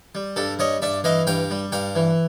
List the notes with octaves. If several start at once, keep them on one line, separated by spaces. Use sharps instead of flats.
G3
G2 G4 A4
G3 C#5 D#5
G2 D5 E5
E3 D#5 F5
G2 F5 G5
G3
G2 F5 G5
E3